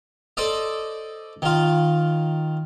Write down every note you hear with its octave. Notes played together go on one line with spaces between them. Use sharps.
A4 C5 D5 D#5
D#3 F4